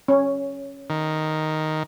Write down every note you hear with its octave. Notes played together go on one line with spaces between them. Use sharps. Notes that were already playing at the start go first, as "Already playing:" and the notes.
C#4
D#3